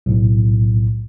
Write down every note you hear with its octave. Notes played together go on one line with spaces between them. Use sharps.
B1 A2